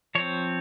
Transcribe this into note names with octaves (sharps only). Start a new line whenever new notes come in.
F3 C4 C#5